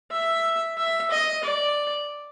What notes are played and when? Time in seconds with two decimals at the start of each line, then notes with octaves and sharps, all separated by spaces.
0.12 E5
0.78 E5
1.11 D#5
1.44 D5